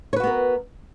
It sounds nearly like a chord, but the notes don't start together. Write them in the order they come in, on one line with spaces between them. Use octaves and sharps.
C#5 B4 F#4 B3 A#4